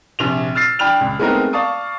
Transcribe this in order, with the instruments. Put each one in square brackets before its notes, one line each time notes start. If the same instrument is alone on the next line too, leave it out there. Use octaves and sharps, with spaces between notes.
[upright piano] A#1 C3 F7
E6 F6 A6 C7
D4 G5 B5 F6 F7
C#2
G#3 A3 B3 C4 D#4 A#4
D5 F5 A5 C#6 D#6